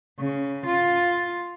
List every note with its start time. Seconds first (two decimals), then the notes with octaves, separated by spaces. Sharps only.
0.19 C#3
0.66 F4